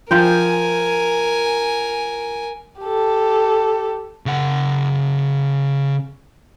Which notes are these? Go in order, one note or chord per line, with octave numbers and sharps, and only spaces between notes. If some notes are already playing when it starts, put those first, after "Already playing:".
F3 A#4 C5 G5 G#5
G4 A4
C#3 F#5